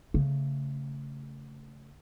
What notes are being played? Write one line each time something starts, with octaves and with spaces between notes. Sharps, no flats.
C#3 A3